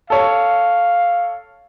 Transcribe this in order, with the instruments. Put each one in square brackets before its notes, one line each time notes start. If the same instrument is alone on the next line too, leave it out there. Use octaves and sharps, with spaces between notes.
[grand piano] A4 C#5 [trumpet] F5